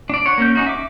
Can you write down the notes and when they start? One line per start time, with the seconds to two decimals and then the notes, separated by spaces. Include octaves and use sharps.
0.10 D4 D5
0.26 C#5 F#5
0.38 A#3 C#4 G6
0.55 C#4 D#4 F#4
0.67 E5 D6